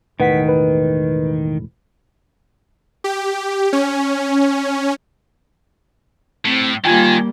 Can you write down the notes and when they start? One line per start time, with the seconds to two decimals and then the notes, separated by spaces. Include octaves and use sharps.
0.20 E1 A2 D#3 B4 F#5 B6
0.48 B4
3.04 G4
3.73 C#4
6.45 A2 C4
6.85 D#3 G3 A#3 F4 G5 G#5 G#6